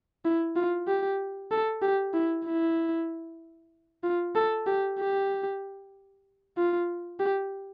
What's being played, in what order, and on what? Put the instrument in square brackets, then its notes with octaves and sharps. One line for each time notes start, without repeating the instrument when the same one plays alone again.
[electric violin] E4
F4
G4
A4
G4
E4
E4
F4
A4
G4
G4
F4
G4